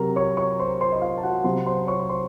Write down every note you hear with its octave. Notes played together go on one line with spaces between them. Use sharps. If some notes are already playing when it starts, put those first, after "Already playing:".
Already playing: C3 F#3 A#4 A#5
C#5 C#6
C#5 C#6
C5 C6
C5 C6
D#5
F4 F5
A5
F#4 F#5
C3 F#3 C5 C6
C5 C6
C#5 C#6
C#6
C5 C6